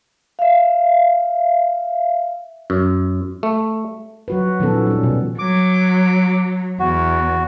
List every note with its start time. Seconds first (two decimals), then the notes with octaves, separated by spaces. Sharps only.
0.39 E5 F5
2.70 F#2
3.43 A3
4.28 F#3 F#4 B4
4.60 A#2 D#3 F3 B3 C#4 A4
4.87 G3 C#4
5.03 B2
5.39 F#3 D6
6.80 E2 F#4